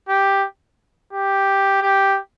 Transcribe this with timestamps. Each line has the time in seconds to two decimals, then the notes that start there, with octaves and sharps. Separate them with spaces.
0.09 G4
1.13 G4
1.82 G4